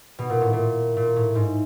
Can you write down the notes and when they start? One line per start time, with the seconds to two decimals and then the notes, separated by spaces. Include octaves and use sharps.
0.19 B2
0.30 A#2
0.41 A2
0.53 A#2
0.97 A#2
1.16 A2
1.35 G#2